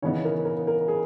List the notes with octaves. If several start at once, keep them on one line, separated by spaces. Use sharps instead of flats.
C#3 E3 B3 D#4 C#5
A#4
A#4
A#4
G#4